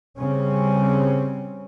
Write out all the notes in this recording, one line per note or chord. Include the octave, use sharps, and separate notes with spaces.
C#3 G3 C4 C#4